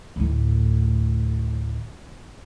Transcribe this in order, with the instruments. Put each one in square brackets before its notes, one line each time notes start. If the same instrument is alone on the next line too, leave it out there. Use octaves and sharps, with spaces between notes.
[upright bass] D2 A2